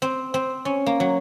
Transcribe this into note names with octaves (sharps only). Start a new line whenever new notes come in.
C4
C4
C#4
A#3
F#3